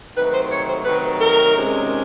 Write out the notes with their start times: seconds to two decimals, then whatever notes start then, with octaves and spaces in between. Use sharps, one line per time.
0.16 C3 D#3 F#3 A3 B4
0.33 C5
0.50 C#5
0.68 C5
0.85 C3 D#3 F#3 A3 B4
1.20 A#4
1.55 D2 C3 D#3 G#3 C#4